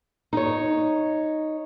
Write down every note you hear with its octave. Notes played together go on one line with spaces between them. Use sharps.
D#4 C#5